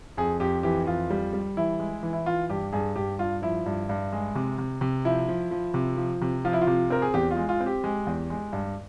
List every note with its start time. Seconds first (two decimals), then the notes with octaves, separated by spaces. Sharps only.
0.17 F2 G#4
0.40 F2 G4
0.63 E3 G4
0.87 F2 F4
1.10 G3
1.33 G3
1.57 E3 E4
1.80 G#3
2.03 E3
2.13 E4
2.26 E3 F4
2.50 G2 G4
2.73 G2 G#4
2.96 G2 G4
3.19 G2 F4
3.42 F3 E4
3.66 G2
3.89 G2
4.13 G#3
4.35 C3
4.58 C3
4.81 C3
5.05 F3 E4
5.28 F3
5.51 F3
5.74 C3
5.97 F3
6.21 C3
6.45 F3 F4
6.53 E4
6.61 F4
6.67 C3
6.90 C4 A#4
7.02 G#4
7.14 E2 G4
7.31 F4
7.37 G#3
7.49 F4
7.60 C4
7.66 G4
7.84 G#3
8.07 E2
8.30 G#3
8.53 G2